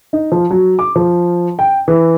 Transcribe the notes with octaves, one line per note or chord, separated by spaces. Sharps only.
D#4
F3
F#3
D6
F3
G5
E3